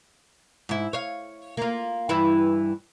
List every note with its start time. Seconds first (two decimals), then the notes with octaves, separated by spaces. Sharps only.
0.69 G#2 E4
0.93 C#5 F5
1.57 A#3 F4
2.09 G2 E3 E4